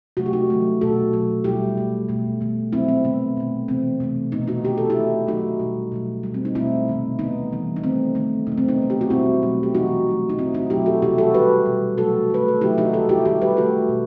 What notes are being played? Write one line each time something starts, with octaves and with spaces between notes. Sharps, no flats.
C3 F#3 A3 F#4
G4
D#4 F#4
D#3 F#3 A3
B2 A3 F#4 A4
B2 F#3 A3
B2 G3 E4 G4
B2 A3
B2 A3
D#3 A3
C3 F#3 A3 C4 E4
C4
C3 D#3 A3 B3
B2 A3
C3 E3 A3 C4
C3 E3 A3
B2 A3 B3 D#4
D#4 F#4
D#3 A3 G4
A4
E4 G4
D#3 A3
D#3 F#3 A3 D#4 F#4
B2 G3
B2 F#3 A3
B2 G3
C4
D#4
B2 A3 C4 E4
C3 D#3 A3
D#3 A3 B3 D#4
C3 E3 G3
D#4
D#3 A3 C4
D#3 A3
C3 F#3 A3 D#4
C4
B3 D#4
B2 A3
G4
F#4
B2 G3 C4 E4
B2 F#3 A3
G4
C3 E3 G3 D#4 F#4
D#3 F#3 A3
D#4
B2 A3 C4 E4
D#4 F#4
B2 F#3 A3 E4 G4
F#4 A4
C3 E3 G3 E4 G4
F#4 A4
D#3 G3 G4 B4
B2 G3
C3 F#3 A3 F#4 A4
D#3 A3 B4
A4
C3 D#3 F#3 A3 E4 G4
D#4 F#4
D#3 G3 F#4 A4
E4 G4
D#3 G3 E4 G4
G4 B4
D#3 A3 F#4 A4
B2